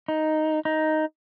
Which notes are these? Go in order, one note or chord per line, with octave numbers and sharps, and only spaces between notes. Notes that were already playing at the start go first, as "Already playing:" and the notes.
D#4
D#4